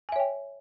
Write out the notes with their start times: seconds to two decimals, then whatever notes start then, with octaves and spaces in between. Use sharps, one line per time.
0.09 G#5
0.12 E5
0.16 C#5
0.19 G5